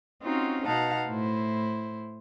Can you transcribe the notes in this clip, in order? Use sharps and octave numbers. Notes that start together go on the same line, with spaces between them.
C4 C#4 D#4 F4 F#4
B2 D#4 D#5 F5 F#5 A5
A2 E4 C5